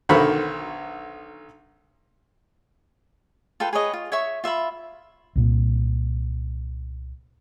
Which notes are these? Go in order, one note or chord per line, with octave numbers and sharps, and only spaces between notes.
B1 D3 D#3 C5 B5 C#6
F4 A4 B4 G5
G#4 B4 C#5 D#5
F4
C#5 E5 C#6
F4 E5 F5 B5
C2 A#2 A#3